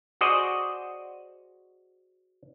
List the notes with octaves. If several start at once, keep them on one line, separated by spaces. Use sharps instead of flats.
F#4 G#4 C5 D5 D#5